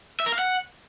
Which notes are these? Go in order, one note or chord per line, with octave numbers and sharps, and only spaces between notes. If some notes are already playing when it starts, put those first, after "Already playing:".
E5
A#4
F5
F#5